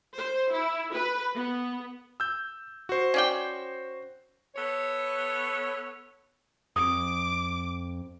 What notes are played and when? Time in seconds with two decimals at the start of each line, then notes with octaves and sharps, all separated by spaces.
0.13 C5
0.50 E4
0.91 B4
1.34 B3
2.20 E6 G6
2.89 F#4 C5
3.14 C#4 D5 G5
4.55 B3 A4 C#5
6.76 F2 D6 D#6